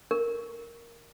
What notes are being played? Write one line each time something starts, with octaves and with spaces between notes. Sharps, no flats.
A#4